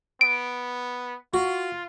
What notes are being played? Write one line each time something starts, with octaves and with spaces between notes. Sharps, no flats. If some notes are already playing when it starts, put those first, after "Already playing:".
B3 D7
F4 F#4